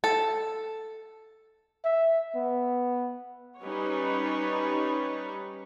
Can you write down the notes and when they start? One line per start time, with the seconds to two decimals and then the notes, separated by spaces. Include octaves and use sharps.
0.04 A4
1.84 E5
2.35 B3
3.63 G3 C#4 D#4 B4 C#5